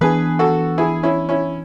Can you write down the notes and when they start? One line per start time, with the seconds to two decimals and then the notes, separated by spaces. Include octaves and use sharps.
0.01 E3 B3 D4 G#4 B4
0.39 F#4 A4
0.78 E4 G#4
1.03 C#4 E4
1.29 C#4 E4